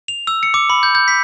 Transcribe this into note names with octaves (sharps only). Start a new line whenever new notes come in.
F7
E6
C#7
D6
B5
G6
G6
B6